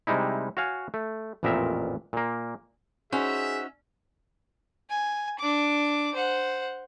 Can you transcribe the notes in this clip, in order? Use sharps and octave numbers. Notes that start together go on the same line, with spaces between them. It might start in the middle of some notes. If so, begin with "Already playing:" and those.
C3 G3 G#3 D#4 E4
F#4 C#5 F5 G#5
A3
A1 F2 A#2 B3 A#4 E5
A#2 A#3
C#4 D#4 F#4 G#4 C5 E5
G#5
D4 D6
C5 F#5